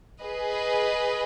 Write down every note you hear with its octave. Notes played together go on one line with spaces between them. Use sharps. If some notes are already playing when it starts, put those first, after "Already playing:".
G#4 B4 D#5